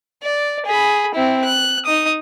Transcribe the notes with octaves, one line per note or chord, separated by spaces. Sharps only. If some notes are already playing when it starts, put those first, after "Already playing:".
D5
G#4 B5
C4 E4
F#6
D#4 D#6